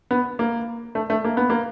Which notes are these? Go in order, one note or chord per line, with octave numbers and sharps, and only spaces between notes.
B3
A#3
A3
A3
A#3
B3
A#3